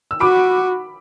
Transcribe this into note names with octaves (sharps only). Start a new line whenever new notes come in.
E6
F#4 B5 D6